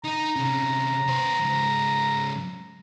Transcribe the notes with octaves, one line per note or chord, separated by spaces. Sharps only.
D#4 D#5 A#5
C3 C#4
B3 C5
G#2 C#3